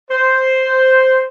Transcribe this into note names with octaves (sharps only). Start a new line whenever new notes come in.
C5